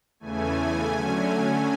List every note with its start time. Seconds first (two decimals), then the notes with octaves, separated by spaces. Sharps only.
0.20 E2 C#3 E3 A3 G#5
0.56 G#5
0.93 D3 F#3 A3 C#4